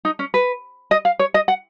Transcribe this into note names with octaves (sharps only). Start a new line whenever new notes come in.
D#4
C#4
B4
D#5
F5
C#5
D#5
F#5